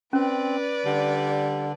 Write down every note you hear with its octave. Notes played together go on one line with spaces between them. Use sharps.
C4 C#4 B4 D5
D3 G3